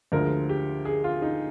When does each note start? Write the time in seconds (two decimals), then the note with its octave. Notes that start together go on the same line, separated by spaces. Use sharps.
0.12 D2 D3 F3 G#3 A#4
0.49 G4
0.85 G#4
1.04 F4
1.22 D#4